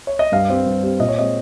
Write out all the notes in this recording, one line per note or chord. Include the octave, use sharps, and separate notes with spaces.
C#5
D#5
G2 F5
G3 C4
G2
G3 C4
A#2 D#5
C#5
G#3 C4 D#5